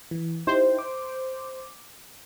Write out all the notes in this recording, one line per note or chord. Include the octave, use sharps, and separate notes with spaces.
E3
D#4 E4 G4 C5
D6